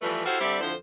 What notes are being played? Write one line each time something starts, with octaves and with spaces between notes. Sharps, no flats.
E3 F3 G3 A3 B4
E4 F#4 G4 A4 C5 F5
D3 G3 C4 G4 D5 E5
F2 D3 F3 E4 C5